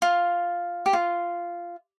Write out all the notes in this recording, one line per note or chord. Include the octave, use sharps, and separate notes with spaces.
F4
G4
F4